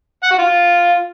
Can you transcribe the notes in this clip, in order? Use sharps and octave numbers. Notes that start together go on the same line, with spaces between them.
F#5
F#4
F4